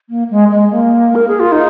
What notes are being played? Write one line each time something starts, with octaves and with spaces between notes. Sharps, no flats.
A#3
G#3
G#3
A#3
A#4
G#4
F4
D#4